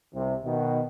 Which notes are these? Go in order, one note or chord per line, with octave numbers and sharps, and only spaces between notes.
C2 C3
B2 D#3